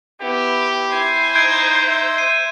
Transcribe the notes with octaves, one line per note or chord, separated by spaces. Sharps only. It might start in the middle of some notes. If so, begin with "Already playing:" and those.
B3 E4 G4
E4 C5 G#5
D#4 G6 G#6 D7
E5 C6
D#7